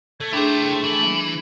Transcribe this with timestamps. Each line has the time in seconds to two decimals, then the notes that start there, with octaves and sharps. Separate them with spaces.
0.20 A3 G#6
0.33 D4 E4 G#4 C5 G5
0.84 E3 F#7